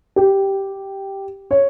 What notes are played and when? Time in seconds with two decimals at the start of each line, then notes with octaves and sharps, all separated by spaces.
0.16 G4
1.51 C#5